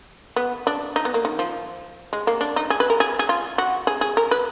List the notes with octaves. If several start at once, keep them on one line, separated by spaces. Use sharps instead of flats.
B3
D4
D#4
B3
A#3
D#3
F3
G#3
A#3
D4
D#4
G#4
B4
A#4
G#4
G#4
F4
F#4
G#4
G#4
A#4
B4